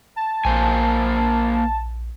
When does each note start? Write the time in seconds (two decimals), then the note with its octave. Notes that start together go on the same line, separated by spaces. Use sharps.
0.16 A5
0.45 A#1 A#3 C5 G#5